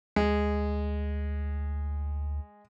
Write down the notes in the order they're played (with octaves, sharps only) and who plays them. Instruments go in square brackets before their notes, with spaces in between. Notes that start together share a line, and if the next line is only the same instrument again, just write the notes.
[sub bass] D2 [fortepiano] G#3